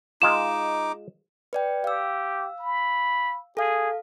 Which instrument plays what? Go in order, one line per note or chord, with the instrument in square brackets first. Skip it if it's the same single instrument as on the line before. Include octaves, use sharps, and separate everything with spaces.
[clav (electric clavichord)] G#3 F4 G#4 [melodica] D#4 D6 [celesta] E7
[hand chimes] B4 D5 G5
[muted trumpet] G4 [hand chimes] F5 E6
[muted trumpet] B5
[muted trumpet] G#4 [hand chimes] A4 F5